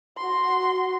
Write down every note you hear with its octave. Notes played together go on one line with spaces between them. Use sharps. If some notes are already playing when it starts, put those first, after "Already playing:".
F#4 C6